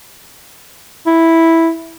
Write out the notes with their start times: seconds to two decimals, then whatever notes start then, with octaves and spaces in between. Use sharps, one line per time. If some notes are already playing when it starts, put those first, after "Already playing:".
1.06 E4